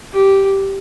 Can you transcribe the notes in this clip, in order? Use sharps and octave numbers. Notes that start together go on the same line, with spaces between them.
G4